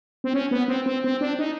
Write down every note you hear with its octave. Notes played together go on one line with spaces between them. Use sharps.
C4
C#4
B3
C4
C4
C4
D4
D#4